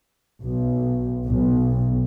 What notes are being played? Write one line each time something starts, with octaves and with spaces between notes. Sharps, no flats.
B1
B1